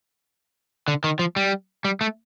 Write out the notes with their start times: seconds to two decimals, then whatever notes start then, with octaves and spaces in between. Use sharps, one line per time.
0.88 D3
1.04 D#3
1.19 F3
1.36 G3
1.85 G3
2.01 A3